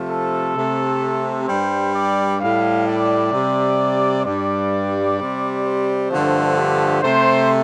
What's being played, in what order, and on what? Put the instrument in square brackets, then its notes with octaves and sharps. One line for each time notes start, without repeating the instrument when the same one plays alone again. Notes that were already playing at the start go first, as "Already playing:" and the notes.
Already playing: [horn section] C3 F3 A3
A4
C3 A3
G2 G3 C5
D5
A2 G3 F5
D5
C3 G3
G2 G3 D5
C3 G3
C5
G2 D3 F3 A3
G4
C3 A3 C5